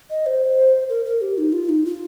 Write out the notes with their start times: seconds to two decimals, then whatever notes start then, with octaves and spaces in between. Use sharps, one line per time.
0.10 D#5
0.26 C5
0.89 A#4
1.05 A#4
1.21 G4
1.38 D#4
1.53 F4
1.69 D#4
1.86 F4